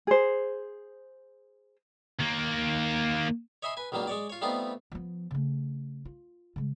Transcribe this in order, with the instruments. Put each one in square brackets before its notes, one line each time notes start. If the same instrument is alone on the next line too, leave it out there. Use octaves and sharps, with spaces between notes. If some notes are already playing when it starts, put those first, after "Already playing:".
[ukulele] G#4 C5
[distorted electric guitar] D#3 A#3
[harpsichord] C#5 D#5 E5 G#5 B5 C6
B4 G#5
C#2 D#3 F#3 G3 A#3
G#3 C#5 D5
F4 C#5
G3 A3 B3 C4 D#4 F4
[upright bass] F3 B3
C#3 A3
F4
C#3 G#3